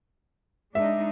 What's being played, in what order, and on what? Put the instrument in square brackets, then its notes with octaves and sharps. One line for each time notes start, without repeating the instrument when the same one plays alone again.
[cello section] G#3 D4 D#4 [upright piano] E5